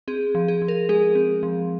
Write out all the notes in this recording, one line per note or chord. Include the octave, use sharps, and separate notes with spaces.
C4 G#4
F3
G#4
F3
A#4
G#3 G#4
C4
F3